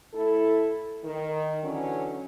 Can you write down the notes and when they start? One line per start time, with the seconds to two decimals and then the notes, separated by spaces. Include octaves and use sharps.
0.14 A2 E4 A4
1.04 D#3
1.63 D3 E3 F#3 C#4